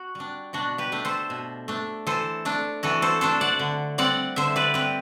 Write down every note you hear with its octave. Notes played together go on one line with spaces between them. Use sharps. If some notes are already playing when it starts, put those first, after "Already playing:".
Already playing: F#4
G3 D4
B2 D4 F#4
G4 B4
A3 D4
A4 C5
B2
A3 D4
E3 A4 C5
A3 D4
E3 F#4 A4
A4 C5
A3 D4 A4 C5
D5 F#5
D3
G3 C4 D5 F#5
D3 C5 E5
B4 D5
G3 C4 G4 B4